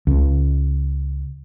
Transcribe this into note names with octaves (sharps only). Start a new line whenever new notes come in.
C#2